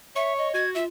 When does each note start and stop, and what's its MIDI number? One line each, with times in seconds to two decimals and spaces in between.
0.16 0.50 73
0.16 0.33 76
0.16 0.48 85
0.38 0.63 75
0.54 0.76 66
0.54 0.70 92
0.75 0.87 65
0.75 0.84 76